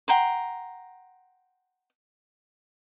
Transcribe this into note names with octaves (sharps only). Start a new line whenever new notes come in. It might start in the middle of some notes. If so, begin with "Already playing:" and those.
F#5 G5 A#5 C6